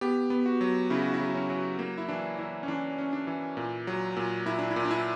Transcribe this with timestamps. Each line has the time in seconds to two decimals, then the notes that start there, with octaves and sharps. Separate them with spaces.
0.01 B3 G4
0.30 B3
0.46 F#4
0.61 F#3
0.90 C#3 E4
1.02 F#4
1.14 E4
1.20 F#3
1.34 C#4
1.50 F#3
1.79 A#3
1.98 E4
2.08 E3 D4
2.38 E3 E4
2.63 C#4
2.68 E3 D4
2.98 C#4
3.13 D4
3.27 E3
3.57 A#2
3.87 F#3
4.17 A#2
4.46 A#2 E4
4.58 D4
4.71 E4
4.76 A#2
4.85 D4
4.91 E4